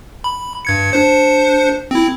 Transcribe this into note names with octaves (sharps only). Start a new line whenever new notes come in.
B5
G2 G#6 C#7
D4 C5 C#7
C4 E4